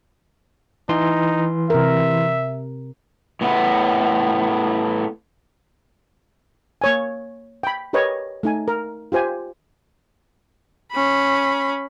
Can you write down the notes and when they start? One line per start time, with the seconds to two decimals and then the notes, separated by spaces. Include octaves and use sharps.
0.89 E3 D#4 C6
1.70 C3 A#4 E5
3.41 A2 B3
6.81 A#3 C#5 G#5
7.63 G5 B5
7.93 G4 A#4 B4 C#5 D#5
8.43 A3 D#4 G#5
8.68 A#4
9.12 F4 G4 C5 G#5
10.92 C#4 B5